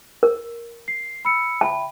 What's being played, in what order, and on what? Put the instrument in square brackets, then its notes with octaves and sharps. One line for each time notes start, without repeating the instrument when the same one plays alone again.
[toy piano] A#4
[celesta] C7
B5 E6 C#7
[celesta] E5 G5 B5 [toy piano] A5